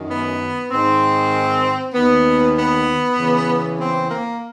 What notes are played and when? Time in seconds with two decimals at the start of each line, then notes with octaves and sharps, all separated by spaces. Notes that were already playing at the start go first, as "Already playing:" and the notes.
Already playing: F#2 D#3
0.09 B3
0.70 G#2 D#3 C4
1.93 D#2 D#3 B3
2.55 B3
3.16 E2 C#3 E3
3.77 C4
4.08 A#3